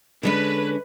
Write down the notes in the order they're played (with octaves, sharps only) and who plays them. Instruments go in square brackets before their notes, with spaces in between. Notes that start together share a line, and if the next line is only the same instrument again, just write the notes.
[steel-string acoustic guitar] D3 G#3 C#4 [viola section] B4